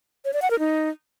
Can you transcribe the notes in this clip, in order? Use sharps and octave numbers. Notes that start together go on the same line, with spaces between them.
C#5
D5
F#5
A#4
D#4